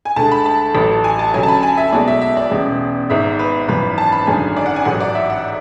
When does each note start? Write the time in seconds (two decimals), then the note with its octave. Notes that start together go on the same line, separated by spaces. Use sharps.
0.05 G#5
0.16 D2 D3 G#3 A5
0.32 B5
0.46 A5
0.75 A1 A2 F#3
1.04 G#5
1.19 A5
1.34 D2 C#3 F#3 G#5
1.43 A5
1.48 B5
1.63 G#5
1.77 E5
1.92 B1 B2 G#3 D5
2.08 E5
2.21 E5
2.37 D5
2.51 E1 E2 C#3 G#3
3.10 G#1 G#2 G#3 E5
3.39 B4
3.68 G#1 F#2 E3 B4
3.98 A5
4.12 B5
4.27 G#1 F#2 D3 G#3 G#5
4.57 D5
4.66 F#5
4.76 G#5
4.85 A1 G#2 F#3 F#5
5.00 D5
5.15 E5
5.30 F#5